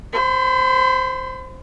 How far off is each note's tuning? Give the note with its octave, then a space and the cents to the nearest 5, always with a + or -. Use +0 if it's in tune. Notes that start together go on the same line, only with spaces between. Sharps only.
C5 +0 B5 +40